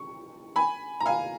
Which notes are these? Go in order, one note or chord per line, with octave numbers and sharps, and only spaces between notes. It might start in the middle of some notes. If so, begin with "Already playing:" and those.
Already playing: C#6
G#5 B5
A#5
F5 G#5